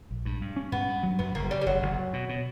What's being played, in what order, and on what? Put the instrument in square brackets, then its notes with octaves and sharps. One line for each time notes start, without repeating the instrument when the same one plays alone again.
[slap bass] A#1
G2
G2
C#4
[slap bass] G2 [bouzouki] B3
[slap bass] G2
F#3
[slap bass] F#2 [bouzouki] B3
[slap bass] F#1 [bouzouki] A#3
[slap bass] C#3 [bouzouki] G3
[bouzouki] G3
[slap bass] F#1 [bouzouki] F#3
[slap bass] F#1
F#2
B2
B2